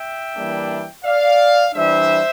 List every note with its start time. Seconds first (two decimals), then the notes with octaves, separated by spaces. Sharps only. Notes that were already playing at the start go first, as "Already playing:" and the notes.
Already playing: E5 G5
0.36 E3 G3 A#3 D4
1.05 D5 F5
1.73 E3 G3 D4 C5 E5